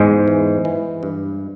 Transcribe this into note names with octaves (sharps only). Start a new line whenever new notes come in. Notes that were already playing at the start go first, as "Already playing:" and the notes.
Already playing: E2 G#2 G#3
E3
E3
G2